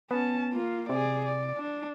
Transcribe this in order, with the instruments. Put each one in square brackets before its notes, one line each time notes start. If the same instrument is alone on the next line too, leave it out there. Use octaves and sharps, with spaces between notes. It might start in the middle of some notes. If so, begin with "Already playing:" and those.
[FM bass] B3 [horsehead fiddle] C#4 A5
[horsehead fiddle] A#3 F4
[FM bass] C3 [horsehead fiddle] G#4 D5
[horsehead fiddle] D5
D4